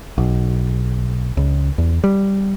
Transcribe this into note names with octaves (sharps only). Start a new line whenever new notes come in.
B1
C#2
E2
G3